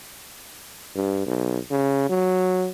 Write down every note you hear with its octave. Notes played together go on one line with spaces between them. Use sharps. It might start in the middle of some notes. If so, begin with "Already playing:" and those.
G2
B1
C#3
F#3